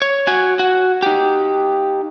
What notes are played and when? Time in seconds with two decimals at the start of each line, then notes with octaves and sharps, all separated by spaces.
0.02 C#5
0.27 F#4 G#5
0.59 F#4
1.03 D#4 G4